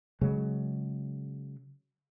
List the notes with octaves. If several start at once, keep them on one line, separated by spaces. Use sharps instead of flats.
C#3 F#3 G#3